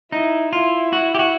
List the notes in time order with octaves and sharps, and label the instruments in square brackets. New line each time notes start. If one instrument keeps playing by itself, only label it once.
[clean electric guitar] D#4 [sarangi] E4
[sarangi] E4 [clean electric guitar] F4
[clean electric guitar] F#4
G4
F#4